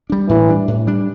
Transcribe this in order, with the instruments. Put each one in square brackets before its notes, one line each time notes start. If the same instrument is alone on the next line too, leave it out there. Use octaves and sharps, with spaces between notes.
[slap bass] G3 D4
[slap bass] A2 [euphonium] E3
[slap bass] G3 D4
A2
G3 D4